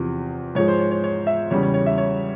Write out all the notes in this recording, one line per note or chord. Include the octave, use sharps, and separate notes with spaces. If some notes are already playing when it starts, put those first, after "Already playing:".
Already playing: E2 C3 F3
G#2 F3 G#3 C#5
C5
C#5
C#5
C#5
E5
E2 C#3 G3 C#5
C#5
C#5
E5
C#5